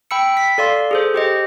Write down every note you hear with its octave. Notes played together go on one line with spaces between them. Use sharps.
G5 B5 E6 C#7
B6
A4 D5 F5 C6
G#4 A4 C5
G4 C5 D#5